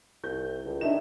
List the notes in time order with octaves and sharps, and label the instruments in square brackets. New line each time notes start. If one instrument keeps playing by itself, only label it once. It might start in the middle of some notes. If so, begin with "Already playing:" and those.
[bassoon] C2 [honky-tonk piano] G6
[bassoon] C#2
[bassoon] D#3 [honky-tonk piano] D4 E5 E7